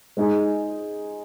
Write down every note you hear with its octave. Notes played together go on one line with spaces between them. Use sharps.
G#3 D#4 G#4